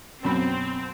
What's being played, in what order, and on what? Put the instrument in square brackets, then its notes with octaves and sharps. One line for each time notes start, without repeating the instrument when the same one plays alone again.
[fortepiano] F#2 B2 B5 [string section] C4